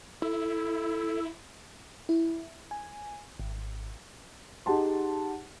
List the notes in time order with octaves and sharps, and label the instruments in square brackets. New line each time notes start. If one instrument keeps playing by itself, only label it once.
[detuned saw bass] E4 [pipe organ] A4
[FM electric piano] E4
G#5
G#1
[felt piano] D#4 G4 G#4 F#5 A5 C6